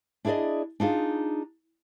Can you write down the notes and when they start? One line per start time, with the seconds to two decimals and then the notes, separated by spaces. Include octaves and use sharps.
0.25 D4 E4 G#4 A#4 D5 D#5
0.80 D4 D#4 F4 G#4